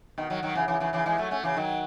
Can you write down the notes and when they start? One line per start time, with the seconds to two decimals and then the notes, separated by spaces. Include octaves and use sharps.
0.18 B2 D#3
0.30 D#3 F#3
0.43 D#3 F#3
0.55 C#3 E3
0.68 C#3 E3
0.80 C#3 E3
0.93 C#3 E3
1.06 E3 G#3
1.18 F#3 A3
1.31 A3 C#4
1.43 C#3 E3
1.57 D#3 F#3